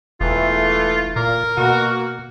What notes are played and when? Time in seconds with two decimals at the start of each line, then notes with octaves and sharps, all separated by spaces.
0.21 E1 E3 A3 F4
1.16 A#2 A#4
1.58 B2 A#3 F#4